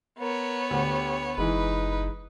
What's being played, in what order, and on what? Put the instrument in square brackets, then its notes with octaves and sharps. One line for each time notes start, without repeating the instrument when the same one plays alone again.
[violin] B3 C#5 [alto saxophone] A#4
[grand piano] D2 D3 [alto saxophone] G4
[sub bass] F#1 [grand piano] E3 G#3 [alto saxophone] D#4 [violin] B4